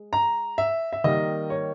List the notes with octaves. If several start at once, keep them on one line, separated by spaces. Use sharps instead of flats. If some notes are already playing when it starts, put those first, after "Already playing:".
Already playing: G#3
A#5
E5
E5
D#3 G3 A#3 D#5
C#5